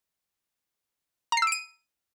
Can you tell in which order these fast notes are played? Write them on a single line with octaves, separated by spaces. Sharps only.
A#5 C7 E6 D7 D#7